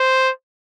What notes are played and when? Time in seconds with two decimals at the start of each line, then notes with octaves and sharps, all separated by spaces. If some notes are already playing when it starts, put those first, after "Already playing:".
Already playing: C5